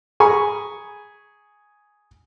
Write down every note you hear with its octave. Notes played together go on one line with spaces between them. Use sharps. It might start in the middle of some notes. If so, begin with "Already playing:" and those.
G#4 G#5 A#5 B5 C#6